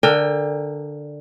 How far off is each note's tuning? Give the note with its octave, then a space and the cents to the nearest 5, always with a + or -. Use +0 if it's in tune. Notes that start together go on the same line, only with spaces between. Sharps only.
D3 +5 A#4 +0 G5 +30